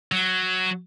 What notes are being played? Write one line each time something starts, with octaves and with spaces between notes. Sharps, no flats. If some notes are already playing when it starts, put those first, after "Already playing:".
F#3